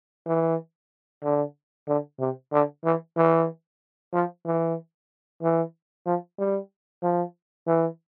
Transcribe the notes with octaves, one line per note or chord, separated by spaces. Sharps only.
E3
D3
D3
C3
D3
E3
E3
F3
E3
E3
F3
G3
F3
E3